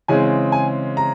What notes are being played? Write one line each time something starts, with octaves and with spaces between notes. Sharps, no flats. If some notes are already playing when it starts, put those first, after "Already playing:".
C#3 E3 G#3 C4 G#5
G#5
A#5